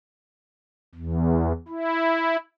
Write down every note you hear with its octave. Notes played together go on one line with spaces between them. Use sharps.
E2
E4